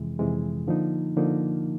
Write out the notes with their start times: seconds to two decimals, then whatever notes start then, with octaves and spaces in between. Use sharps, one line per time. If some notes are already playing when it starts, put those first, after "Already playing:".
Already playing: F2 C3 E3 G#3
0.19 F2 C3 E3 G#3
0.68 D3 F3 A#3 D#4
1.17 D3 F3 A#3 D#4